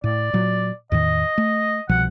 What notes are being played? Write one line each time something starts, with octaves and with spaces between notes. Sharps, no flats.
A2 D5
A#2 F#3
E2 A2 D#3 D#5
A3
C2 B2 F3 F#5